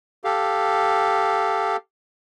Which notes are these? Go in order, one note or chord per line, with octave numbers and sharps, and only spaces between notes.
G4 A4 F5